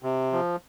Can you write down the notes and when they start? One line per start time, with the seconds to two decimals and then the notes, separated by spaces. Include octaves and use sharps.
0.03 C3
0.32 F3